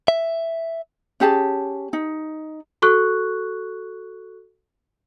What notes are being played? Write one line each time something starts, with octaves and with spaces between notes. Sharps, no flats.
E5
C#4 G4 G#4 A5
D#4
F#4 A4 C#6 F#6